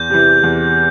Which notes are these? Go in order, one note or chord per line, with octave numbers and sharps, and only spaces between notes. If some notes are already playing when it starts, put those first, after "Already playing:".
Already playing: E2 G6
C3 E3
E2